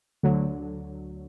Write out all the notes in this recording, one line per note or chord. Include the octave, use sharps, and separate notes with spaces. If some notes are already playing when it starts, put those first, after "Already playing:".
D2 D3 F#3